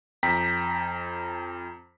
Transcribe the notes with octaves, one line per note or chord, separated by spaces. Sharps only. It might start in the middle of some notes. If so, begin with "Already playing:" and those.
F2 G5 A#5 B6